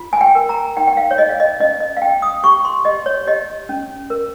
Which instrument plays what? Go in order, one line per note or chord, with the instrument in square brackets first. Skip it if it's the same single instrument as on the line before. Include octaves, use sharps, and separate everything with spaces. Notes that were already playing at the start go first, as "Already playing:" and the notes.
Already playing: [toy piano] F4
G#5
G5
A#4
A#5
D#4 G5
G5
F5
C#5
G#4 D#5
F5
D#5
C#4 D#5
D#5
F5
C#4 G5
D#6
G4 C#6
C6
G4 D#5
C#5
G4 D#5
C#4
A#4